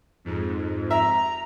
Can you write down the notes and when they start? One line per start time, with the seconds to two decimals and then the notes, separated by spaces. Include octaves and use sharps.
0.25 F2 G#2
0.91 E5 A#5